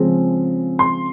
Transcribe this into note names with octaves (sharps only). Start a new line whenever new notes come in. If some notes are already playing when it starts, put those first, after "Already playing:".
Already playing: C#3 F3 G#3 C4
C6